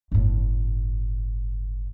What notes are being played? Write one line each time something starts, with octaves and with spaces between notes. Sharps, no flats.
G1 A2